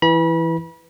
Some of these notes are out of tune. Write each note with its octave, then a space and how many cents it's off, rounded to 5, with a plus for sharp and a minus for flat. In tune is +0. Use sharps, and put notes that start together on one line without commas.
E3 +0 B5 -35